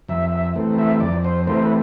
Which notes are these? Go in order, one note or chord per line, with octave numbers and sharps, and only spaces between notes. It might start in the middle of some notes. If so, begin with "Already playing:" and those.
F2 E5
E5
E3 A3 C4
E5
F2 D5
C5
E3 A3 C4 C5
B4